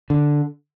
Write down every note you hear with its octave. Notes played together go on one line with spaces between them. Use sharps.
D3